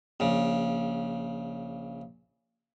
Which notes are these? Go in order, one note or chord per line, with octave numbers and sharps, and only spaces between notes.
A#1 C#3